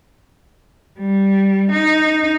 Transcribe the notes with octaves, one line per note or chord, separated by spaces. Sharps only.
G3
D#4